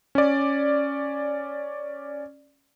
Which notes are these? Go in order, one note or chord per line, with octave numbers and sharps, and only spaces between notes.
C#4 D5